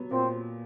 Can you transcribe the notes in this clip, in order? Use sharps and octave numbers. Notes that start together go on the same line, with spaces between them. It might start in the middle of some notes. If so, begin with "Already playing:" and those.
Already playing: F#3 B3
A#2 C4